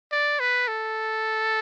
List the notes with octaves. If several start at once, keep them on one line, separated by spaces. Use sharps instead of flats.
D5
B4
A4